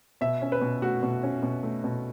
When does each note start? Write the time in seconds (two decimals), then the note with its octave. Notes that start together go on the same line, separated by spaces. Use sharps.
0.21 B2 E5
0.42 C#4
0.52 B4
0.61 B2
0.82 A3 F#4
1.03 B2
1.23 C#4
1.43 B2
1.63 A3
1.84 B2